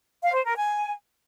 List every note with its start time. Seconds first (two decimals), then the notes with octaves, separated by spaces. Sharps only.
0.23 F5
0.34 C5
0.45 A#4
0.56 G#5